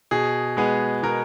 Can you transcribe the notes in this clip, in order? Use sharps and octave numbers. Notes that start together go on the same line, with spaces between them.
B2 G#4
G#3 B3 G#4
B2 A#4